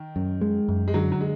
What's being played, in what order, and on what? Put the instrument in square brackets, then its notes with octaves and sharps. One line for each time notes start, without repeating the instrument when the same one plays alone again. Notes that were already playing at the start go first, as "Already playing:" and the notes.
Already playing: [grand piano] D#3
[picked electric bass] F#2
G#3
F#2
[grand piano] G#3
[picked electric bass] D3 [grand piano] F#3
[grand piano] F#3
G#3